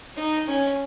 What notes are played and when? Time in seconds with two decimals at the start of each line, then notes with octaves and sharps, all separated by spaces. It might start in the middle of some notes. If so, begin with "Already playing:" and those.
0.16 D#4
0.47 C#4